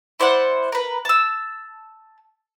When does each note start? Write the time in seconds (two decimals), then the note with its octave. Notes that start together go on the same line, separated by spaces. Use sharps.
0.20 E4 C5 D5 F#5
0.72 A#4 B4
1.05 A5 E6